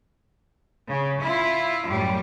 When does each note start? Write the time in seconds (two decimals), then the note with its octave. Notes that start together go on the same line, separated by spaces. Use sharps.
0.89 C#3
1.22 E4 F4
1.87 F#2 A2 G3